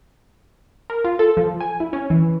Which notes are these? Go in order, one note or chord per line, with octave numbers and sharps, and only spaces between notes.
A#4
F4
A4
F3
G#5
E4
C#4
E3